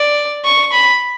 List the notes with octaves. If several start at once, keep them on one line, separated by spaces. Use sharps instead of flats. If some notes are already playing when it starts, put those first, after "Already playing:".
Already playing: D5
C#6
B5